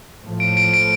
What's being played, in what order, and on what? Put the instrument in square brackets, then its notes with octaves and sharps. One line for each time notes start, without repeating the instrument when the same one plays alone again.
[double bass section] A2 F3 A3
[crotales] D7
D7
D7